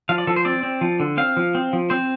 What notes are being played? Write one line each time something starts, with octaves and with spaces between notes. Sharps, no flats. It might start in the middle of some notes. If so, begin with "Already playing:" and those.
F3 F5
D5
F3 A4
C5
C4 D5
C4
F3
D3
C4 F5
F3
C4
F3
C4 C5